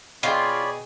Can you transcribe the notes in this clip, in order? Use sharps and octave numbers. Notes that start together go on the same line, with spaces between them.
B2 F4 G#4 C#5 D5 G5 B5